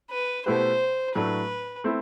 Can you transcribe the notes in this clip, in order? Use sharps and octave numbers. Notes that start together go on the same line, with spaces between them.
B4
B2 A3 E4 G4 B4 C5
A2 F#3 A3 D4 B4
A3 C4 E4